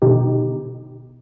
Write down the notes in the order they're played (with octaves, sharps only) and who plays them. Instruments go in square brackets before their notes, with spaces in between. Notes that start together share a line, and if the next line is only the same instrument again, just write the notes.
[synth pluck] B2 D3 D#4 G4